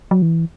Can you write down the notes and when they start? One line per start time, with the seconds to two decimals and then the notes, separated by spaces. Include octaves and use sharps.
0.11 F#3
0.22 E3